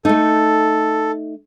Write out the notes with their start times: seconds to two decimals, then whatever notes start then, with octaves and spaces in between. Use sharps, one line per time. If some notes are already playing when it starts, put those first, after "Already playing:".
0.05 A3 D#4 A4